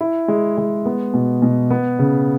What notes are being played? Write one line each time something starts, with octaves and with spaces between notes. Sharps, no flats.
E4
G#3
G#3
B3
B2
B2
B3
C#3